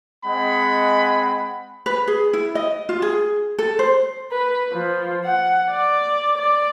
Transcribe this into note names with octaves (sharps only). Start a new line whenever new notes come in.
G#3 C4 D#5 F#5 G#5 B5
B4
G#4
E4
D#5
F4
G#4
A4
C5
B4
F3
F#5
D5
D5